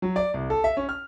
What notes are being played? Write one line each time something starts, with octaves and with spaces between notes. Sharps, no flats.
F#3
D5
C2
A4
E5
C#4
F6